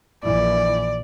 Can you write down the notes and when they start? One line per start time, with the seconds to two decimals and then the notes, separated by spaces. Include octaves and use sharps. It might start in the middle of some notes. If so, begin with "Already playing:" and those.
0.24 A#1 E3 D5